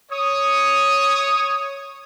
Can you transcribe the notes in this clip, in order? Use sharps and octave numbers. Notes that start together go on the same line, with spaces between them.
C#5 D#6